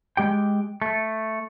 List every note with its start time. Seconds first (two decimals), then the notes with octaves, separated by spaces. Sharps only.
0.17 G#3 G4 G5
0.82 A3